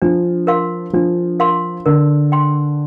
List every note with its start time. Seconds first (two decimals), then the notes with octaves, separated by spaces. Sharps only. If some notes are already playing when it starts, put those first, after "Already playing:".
0.02 F3 D4
0.47 A#4 F5 C6
0.93 F3 D4
1.39 A#4 F5 C6
1.86 D3 A#4
2.32 G5 C6